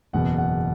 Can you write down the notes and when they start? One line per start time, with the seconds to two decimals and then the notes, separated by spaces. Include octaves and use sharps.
0.13 F#1 E2 B2 F#5
0.38 F#5